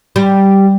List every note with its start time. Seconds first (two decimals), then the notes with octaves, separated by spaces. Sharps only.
0.16 G3